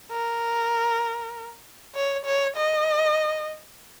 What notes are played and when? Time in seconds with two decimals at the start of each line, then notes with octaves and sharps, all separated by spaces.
0.11 A#4
1.95 C#5
2.26 C#5
2.57 D#5